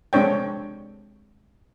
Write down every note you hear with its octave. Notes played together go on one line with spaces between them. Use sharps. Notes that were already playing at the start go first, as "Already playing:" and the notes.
G#3 C4 D4 C#5 G5